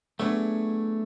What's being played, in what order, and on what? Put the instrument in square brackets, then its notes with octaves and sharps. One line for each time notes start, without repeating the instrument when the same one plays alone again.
[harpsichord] F#3 B3 D4 G#4 [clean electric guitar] A3